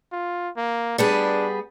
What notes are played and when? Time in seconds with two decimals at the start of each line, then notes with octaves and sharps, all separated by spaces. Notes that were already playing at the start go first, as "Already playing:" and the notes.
0.12 F4
0.56 A#3
0.98 G3 B3 D4 G#4